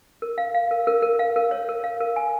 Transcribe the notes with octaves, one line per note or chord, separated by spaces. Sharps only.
A#4
F5
F5
A#4
A#4
A#4
F5
A#4
C#5
A#4
F5
A#4
G#5